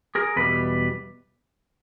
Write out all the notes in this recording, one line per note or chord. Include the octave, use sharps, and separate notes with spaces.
G#4 A#4
E2 B2 G3 B4